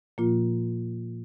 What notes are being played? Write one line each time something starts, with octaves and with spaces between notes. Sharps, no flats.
A#2 F3 A#3 F4